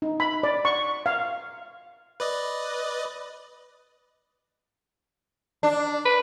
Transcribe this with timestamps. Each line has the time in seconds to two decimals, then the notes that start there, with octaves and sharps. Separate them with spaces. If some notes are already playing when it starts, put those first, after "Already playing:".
0.02 D#4
0.20 B5
0.43 D5
0.65 C#6
1.06 F5
2.20 B4 D5 D#5
5.63 D4
6.05 B4